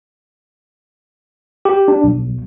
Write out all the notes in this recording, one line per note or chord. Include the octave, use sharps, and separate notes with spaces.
G4
D4
B1